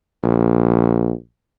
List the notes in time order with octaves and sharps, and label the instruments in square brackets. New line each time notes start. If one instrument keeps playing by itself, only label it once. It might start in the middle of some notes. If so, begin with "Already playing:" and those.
[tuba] A#1